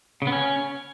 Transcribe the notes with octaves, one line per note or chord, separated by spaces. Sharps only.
C#3
B3
C#4